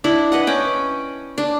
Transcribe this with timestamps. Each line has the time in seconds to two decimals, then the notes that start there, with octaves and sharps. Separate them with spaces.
0.04 D4 E4 B5
0.32 B4 D#5 F#5
0.47 C#4 G5
1.38 D4